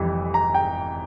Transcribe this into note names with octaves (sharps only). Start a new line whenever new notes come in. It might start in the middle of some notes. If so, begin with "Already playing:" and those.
Already playing: F1 F2 E3 G3
A#5
G5